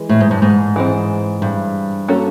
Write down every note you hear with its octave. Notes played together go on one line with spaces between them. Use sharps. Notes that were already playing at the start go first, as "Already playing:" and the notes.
Already playing: E3 G#3
A2
G#2
G2
G#2
E3 G#3 C4
G2
A#3 C#4 F#4 A4